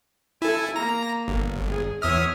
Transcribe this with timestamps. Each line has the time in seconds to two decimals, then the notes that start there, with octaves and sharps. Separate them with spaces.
0.42 E4 A4 G#5
0.76 A#3 A#5
1.28 G1
1.68 G#4
2.02 E2 C#5 E5 D#6 F6